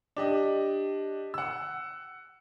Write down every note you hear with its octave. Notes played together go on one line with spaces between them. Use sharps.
D4 G4 D#5
F#5 E6